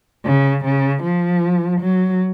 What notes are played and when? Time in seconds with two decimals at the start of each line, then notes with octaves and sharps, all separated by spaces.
0.26 C#3
0.64 C#3
1.03 F3
1.80 F#3